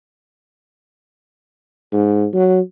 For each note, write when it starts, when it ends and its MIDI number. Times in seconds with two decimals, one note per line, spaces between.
1.93 2.27 44
2.33 2.60 54